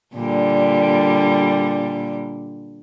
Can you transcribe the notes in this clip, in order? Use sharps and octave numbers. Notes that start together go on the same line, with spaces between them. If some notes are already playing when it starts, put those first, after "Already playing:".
A#2 D3 G3